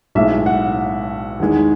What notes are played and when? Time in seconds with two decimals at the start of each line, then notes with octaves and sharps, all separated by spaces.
0.15 B1 A2 G#3 E5
0.46 F#5
1.40 E2 D#3 G#3